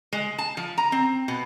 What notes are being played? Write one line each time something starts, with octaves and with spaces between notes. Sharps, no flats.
G#3
A5
F3
A#5
C4
B2